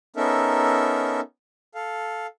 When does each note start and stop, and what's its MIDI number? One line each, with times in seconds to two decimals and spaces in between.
0.16 1.20 59
0.16 1.20 61
0.16 1.20 63
0.16 1.20 69
0.16 1.20 70
0.16 1.20 76
1.75 2.27 69
1.75 2.27 77